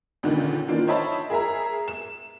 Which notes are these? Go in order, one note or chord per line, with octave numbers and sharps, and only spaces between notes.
C#2 A#2 D3 D#3
D#3 E3 A#3 D4 F4
C5 C#5 D#5 E5 A5 B5
G#4 A#4 E5 A#5
E7